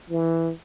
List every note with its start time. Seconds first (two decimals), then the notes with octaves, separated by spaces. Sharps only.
0.10 E3